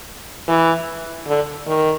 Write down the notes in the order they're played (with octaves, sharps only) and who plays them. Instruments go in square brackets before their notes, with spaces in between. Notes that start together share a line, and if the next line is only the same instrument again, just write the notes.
[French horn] E3
D3
D#3